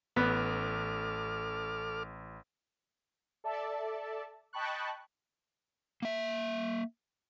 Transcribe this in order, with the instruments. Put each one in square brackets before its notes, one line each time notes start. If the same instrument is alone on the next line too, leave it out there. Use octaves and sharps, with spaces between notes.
[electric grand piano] A1 [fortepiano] B3 [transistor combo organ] A4 D6 F6
[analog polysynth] A4 D5 E5 A5
D#5 G5 A5 B5 C#6 F#6
[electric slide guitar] A#3 E5